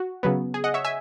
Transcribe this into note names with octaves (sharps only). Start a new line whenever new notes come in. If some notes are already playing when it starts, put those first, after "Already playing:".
Already playing: F#4
C#3 F#3 B3
G#4
D#5 F#5
C#5 E5
E5 G#5